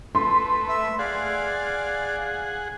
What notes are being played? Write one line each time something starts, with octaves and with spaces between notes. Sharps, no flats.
A3 B4 C6
E5
G#4 D5 F5 F#5